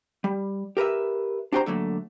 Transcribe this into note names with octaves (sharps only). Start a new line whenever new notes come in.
G3
G4 A#4 B4 E5
D4 F#4 G4 A#4 C5 A#5
D3 F#3 A3 A#3